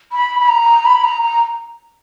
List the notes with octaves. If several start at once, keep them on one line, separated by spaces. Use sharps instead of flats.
B5
B5
A#5
B5
A#5
A#5